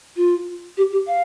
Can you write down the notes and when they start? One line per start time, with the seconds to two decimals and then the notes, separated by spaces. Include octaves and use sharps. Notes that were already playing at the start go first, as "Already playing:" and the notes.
0.16 F4
0.77 G4
0.92 G4
1.07 F5